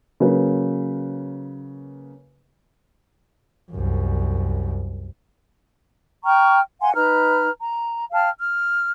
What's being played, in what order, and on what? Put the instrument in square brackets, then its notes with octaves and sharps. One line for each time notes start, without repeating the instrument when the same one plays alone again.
[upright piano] C#3 F#3 A#3 B4
[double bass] C2 F#2
[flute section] G5 A#5 C#6 F6
F5 F#5 G#5 C6
D#4 B4 A#5 F6
A#5
F5 G5 A5 F6
F6